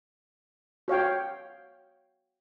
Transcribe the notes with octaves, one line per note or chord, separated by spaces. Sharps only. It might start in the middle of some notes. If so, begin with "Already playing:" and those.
F#4 C#5 F5 G5